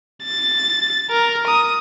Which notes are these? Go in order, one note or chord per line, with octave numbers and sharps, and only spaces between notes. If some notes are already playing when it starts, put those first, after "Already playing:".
A6
A#4
D#6